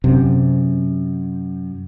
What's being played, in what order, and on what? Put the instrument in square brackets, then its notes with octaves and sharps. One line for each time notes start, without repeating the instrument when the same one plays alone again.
[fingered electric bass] F#2 [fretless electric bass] C3